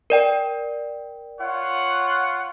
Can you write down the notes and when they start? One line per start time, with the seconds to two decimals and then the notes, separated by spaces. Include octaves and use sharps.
0.10 A#4 D5 G5
1.41 F4 C#5 F#5